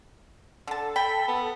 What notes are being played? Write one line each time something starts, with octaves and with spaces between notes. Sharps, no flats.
D3 A4 A5
G5 B5
B3